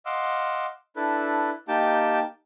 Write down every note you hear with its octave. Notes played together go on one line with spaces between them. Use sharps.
D#5 F5 F#5 C6 D6 E6
D4 E4 A4 B4
A#3 D#4 G4 G5 A5